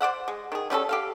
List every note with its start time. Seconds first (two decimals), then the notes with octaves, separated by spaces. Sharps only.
0.01 C5 D5 E5 F#5
0.28 G#3
0.52 D#3 G#4
0.70 G3 C#4 F4 A4
0.89 G4 A4 F5